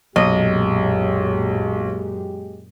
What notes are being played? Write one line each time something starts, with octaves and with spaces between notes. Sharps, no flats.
B1 F#2 A#2 G#3 G4 D#5